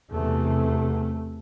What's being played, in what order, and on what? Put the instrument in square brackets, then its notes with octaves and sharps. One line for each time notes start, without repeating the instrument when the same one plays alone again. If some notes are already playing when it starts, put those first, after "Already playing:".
[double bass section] E2 C3 A3